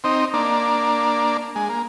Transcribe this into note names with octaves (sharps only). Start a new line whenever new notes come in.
C4 D#4
A#3 D4
G#3
A#3